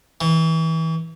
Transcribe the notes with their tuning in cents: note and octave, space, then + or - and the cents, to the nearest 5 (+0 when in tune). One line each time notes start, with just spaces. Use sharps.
E3 -30